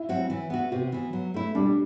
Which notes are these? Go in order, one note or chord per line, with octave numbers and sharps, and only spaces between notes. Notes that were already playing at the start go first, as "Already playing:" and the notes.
Already playing: E4
F#3 C4 F#4
E3
B3 F#4
C3 F#4
E3 B3
F#3
A3 E4
G3 D4